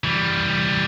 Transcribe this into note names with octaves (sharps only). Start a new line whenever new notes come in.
E3 G3